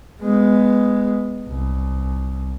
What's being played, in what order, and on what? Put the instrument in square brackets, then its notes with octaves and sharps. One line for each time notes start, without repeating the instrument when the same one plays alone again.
[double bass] G#3 B3
C2